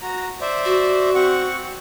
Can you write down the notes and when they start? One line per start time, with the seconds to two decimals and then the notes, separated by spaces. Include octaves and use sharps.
0.02 F#4 A#5
0.41 C5 D5 E5
0.65 F#4
1.15 C4 F#5 C#6